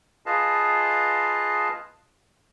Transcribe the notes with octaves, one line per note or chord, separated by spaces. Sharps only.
F4 G#4 B4 D#5 F5 A5